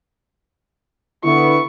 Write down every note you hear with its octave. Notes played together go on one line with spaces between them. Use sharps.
D3 B3 E4 C#6